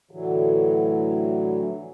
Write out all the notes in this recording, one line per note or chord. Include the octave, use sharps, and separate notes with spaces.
A2 D3 E3 F#3